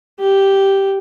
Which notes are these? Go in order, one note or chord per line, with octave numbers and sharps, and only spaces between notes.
G4